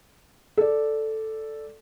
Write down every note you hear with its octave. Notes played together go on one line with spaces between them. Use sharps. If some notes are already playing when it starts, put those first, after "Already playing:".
A4 D5